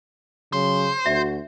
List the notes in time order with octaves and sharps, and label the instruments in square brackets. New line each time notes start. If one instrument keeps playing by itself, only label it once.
[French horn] C#3 [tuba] F#3 [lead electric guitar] C5
[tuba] D2 [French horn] F#4 [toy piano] E5